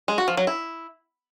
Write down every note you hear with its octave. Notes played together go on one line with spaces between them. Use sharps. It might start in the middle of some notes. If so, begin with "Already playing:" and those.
G#3
F#4
F3
F#3
E4